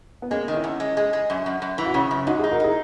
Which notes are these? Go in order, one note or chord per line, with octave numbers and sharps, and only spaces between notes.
B3
G#3 A#3 C#4
D#3
C#4 E4
E2
G#3
G#3
G#3
F#2
F#2
F#2
E3 E4
F#4
C#3 C#4 E4
F#2
G#2 D#4 F#4
E4 G#4
D#4
F#4 A#4
D#4 E4 G#4